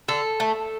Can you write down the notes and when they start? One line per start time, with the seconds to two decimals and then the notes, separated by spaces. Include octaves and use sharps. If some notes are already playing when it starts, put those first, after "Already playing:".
0.08 D3 A4
0.40 A3